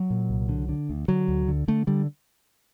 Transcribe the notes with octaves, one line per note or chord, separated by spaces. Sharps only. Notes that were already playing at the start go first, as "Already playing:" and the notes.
Already playing: F#3
A#2
C2
D3
D3
D2
D3 F#3
D2
D3
D3 A3
D3 G3